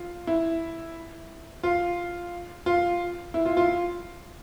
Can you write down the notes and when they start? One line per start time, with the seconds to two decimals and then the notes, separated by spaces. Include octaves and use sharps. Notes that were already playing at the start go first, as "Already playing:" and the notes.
Already playing: F4
0.27 E4
1.63 F4
2.66 F4
3.34 E4
3.45 F4
3.57 F4